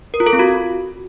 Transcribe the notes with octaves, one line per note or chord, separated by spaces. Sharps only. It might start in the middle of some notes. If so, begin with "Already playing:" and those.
A#4
F4
A4
C4
F#4